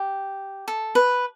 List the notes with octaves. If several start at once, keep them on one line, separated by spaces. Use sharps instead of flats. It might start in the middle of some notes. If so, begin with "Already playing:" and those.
Already playing: G4
A4
B4